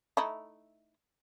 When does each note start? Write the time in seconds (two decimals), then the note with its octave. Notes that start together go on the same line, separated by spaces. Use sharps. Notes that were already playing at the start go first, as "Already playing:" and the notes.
0.17 A3 D#4 E4